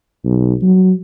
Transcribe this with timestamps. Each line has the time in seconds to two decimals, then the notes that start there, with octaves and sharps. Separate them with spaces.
0.24 B1
0.62 F#3